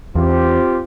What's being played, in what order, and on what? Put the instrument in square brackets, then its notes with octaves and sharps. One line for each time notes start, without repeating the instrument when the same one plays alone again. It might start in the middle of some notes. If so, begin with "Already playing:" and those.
[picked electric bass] E2 [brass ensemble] C4 F4 G4